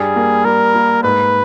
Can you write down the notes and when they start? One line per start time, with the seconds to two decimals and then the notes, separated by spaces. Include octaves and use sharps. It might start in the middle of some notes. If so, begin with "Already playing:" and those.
Already playing: G2 G3 G#4
0.16 A#3
0.45 G3 A#4
0.74 A#3
1.04 G#2 B4